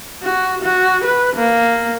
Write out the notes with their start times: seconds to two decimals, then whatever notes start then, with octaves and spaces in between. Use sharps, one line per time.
0.22 F#4
0.62 F#4
1.04 B4
1.36 A#3